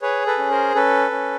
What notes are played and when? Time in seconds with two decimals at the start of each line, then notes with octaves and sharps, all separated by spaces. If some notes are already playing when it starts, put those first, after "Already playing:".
0.02 G#4 B4 C#5
0.26 A4 B4
0.39 C#4
0.50 A#4 C5
0.75 C#4 A4 B4
1.11 C#4